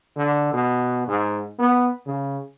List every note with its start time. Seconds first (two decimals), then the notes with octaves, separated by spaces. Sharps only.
0.17 D3
0.53 B2
1.08 G#2
1.59 B3
2.06 C#3